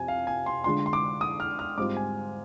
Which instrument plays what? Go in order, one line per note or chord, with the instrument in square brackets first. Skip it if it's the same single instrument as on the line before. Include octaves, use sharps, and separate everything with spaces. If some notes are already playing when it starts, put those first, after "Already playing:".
Already playing: [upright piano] F2 C3 [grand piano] G#5
[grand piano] F5
G#5
C6
[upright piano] D3 G#3 D4 F4 [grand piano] C6
[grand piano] C6
D6
D#6
F6
F6
[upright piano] G#2 G3 C4 F4 [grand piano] D6
[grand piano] G#5